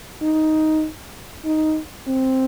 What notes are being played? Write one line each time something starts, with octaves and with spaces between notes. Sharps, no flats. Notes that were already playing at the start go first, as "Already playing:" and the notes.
D#4
D#4
C4